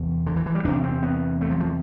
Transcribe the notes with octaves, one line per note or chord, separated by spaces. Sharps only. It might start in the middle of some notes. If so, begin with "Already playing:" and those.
Already playing: E2 C3
D3
E3
E3
G3
E2 C3 D4
C4
B3
A3
F3
F3